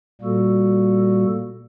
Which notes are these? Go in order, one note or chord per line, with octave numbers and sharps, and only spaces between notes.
A#2 G3 A#3 F#4 A4